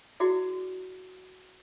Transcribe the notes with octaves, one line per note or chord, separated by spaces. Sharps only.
E4 F#4 G#4 D5